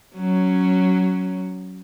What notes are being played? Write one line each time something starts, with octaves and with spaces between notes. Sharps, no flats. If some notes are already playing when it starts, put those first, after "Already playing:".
F#3 C#4